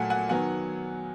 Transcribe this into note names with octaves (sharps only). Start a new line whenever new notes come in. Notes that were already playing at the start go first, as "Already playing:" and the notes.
Already playing: A#2 F#3 A3 F#5 G#5
F#5 G#5
D#3 F#3 B3 F#5 G#5